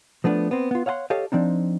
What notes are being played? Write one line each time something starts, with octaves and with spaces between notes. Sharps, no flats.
F3 A3 B3 D4
B3 C4
B3 F4
C#5 F5 F#5 G#5 C6
G4 A4 C#5 D#5 F5
F3 C4 D4 D#4